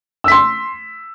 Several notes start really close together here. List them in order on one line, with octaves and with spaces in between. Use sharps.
E6 B6 C6